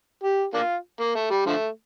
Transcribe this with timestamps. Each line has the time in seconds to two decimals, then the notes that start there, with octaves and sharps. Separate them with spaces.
0.23 G4
0.54 A#3 D4 F4
1.00 A#3
1.15 A3
1.30 G3
1.46 D3 F3 A3